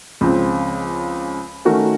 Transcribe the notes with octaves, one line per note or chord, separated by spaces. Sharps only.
C#2 C#3 F3 C4
D#3 A3 C#4 F#4 A#4